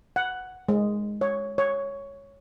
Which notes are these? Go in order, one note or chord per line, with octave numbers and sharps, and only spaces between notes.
F#5
G#3
C#5
C#5